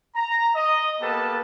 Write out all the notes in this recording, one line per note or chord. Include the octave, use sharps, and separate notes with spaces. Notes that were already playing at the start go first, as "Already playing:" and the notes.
A#5
D#5
A#3 B3 G4 A4 B4 A5